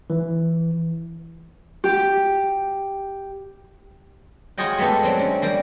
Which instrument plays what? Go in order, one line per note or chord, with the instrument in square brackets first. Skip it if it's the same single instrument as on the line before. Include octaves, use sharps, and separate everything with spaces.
[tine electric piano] E3
[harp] G4
[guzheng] F4 F#4 G#4 C#5 D#5 G5
G#3 A3 B3 G4 A4
F#3 G#3 C4 D4
C#4
G3 A#3